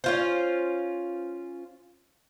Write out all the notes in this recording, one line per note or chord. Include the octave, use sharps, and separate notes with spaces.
C#4 F4 C5